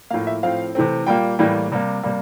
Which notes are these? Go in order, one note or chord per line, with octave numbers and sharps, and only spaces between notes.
A2 F3 A#3 F5
E5
A2 F3 C4 F5
C3 E3 A3 C4
A#2 G3 A#3 G5
A2 E3 G3 A#3
C3 G3 A#3
C3 G3 A#3